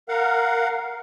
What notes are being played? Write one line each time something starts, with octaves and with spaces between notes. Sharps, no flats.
A#4 F5 F#5